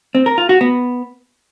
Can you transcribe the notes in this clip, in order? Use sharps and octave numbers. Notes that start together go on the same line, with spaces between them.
C4
A#4
F4
F#4
B3